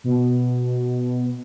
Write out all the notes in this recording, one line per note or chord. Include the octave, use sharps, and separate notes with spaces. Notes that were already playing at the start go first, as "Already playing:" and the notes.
B2